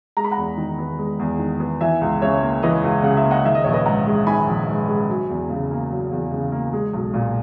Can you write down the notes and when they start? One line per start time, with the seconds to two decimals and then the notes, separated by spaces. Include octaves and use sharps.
0.17 G#3 A#5
0.24 B5
0.32 F#5 A#5
0.37 E2
0.58 D#3
0.78 B3
0.99 G#3
1.19 E2
1.39 D#3
1.60 B3
1.81 E3 E5 G#5
2.01 C#2
2.22 C#3 C#5 E5
2.42 A#3
2.63 E3 B4 D#5
2.83 C#2
3.03 C#3 F#5
3.17 E5
3.24 A#3
3.30 D#5 F#5
3.45 D#3 E5
3.55 D#5
3.64 A#1 C#5
3.73 B4 D#5
3.86 G#2 F#5 A#5
4.07 G#3
4.27 D#3 G#5 B5
4.47 A#1
4.68 G#2
4.88 G#3
5.08 F#3
5.29 E2
5.50 C#3
5.71 A#3
5.91 F#3
6.11 E2
6.32 C#3
6.52 A#3
6.73 G#3
6.93 B1
7.14 A#2